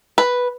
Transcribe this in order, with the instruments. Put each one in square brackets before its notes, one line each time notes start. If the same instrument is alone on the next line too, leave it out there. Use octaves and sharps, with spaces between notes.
[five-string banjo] B4